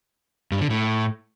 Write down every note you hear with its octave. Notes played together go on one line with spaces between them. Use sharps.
G2
D3
A2